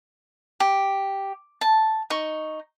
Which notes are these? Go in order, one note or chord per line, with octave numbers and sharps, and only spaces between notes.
G4
A5
D#4 C#6